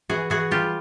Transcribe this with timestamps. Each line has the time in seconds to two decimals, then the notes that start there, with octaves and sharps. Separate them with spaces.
0.10 E3 F#4 G#4
0.30 E3 F#4 G#4
0.51 G3 F4 G4